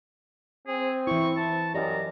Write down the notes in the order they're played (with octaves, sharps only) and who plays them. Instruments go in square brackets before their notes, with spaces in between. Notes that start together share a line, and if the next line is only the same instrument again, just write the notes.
[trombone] C4 [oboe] G#4
[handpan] E3 E4 [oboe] C#6
[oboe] A5
[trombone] F#2 [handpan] G4 D5 D#5 [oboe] A#5